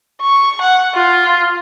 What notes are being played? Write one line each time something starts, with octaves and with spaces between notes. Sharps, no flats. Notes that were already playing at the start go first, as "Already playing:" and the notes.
C#6
F#5
F4